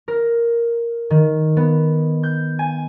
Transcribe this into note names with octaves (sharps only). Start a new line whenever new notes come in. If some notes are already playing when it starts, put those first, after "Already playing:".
A#4
D#3
B3
G6
G#5